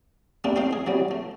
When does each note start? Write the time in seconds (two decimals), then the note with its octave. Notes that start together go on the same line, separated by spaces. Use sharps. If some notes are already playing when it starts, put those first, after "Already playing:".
0.44 G3 A3 A#3 C4 D4
0.56 A3 C4 D#4 C5 F5
0.73 G#4
0.87 C3 F#3 G3
1.11 A3